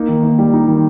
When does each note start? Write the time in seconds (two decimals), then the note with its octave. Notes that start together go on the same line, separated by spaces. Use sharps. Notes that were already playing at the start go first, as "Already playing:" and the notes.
Already playing: A#3 D#4
0.08 D#3
0.23 A#3
0.39 G3
0.54 D#4
0.68 D#3